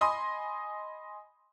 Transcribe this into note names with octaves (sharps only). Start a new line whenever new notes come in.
D#5 G#5 B5 C6 D#6